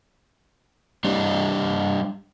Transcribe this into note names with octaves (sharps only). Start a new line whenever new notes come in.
G3 D4 G4 C#5 D#5